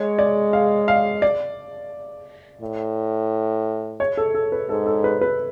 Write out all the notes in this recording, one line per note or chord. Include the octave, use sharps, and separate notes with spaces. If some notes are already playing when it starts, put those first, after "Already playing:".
Already playing: G#3 C#5
D5
F5
F5
D5
A2
C#5
A4
A4
B4
G#2 A4
A4
B4
B4